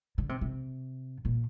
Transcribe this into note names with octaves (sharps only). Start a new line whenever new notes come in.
D3
C3
C3
A#2